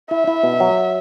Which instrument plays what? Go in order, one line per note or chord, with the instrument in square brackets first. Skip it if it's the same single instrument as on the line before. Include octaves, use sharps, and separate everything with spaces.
[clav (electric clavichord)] E4 [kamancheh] E5
[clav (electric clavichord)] E4
B2
F#3